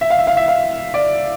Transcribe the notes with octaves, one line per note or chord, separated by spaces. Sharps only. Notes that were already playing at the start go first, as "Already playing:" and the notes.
E5
F5
E5
F5
E5
F5
D5